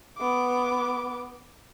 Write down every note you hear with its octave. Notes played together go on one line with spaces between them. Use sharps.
B3 D6